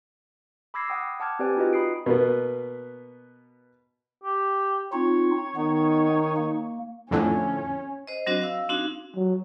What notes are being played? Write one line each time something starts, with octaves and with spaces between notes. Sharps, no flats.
B5 D6 E6 G#6 A#6 C7
F#5 G5 D#6
F#5 A5 D6 F6 G#6
C4 G4 B4 D5 G5 G#5
D#4 F4 F#4 B4 D#5
B5 D#6 C7 D7
B2 A#3 B3
G4
C4 D#4 F4 C#5
D#3 B3 D#4
A#3
F2 A2 D3 C#4
C5 D#5
F#3 C4 D4 F#4 C5 D#5
F5 E6
C4 D4 D#4 F#4 F5
F#3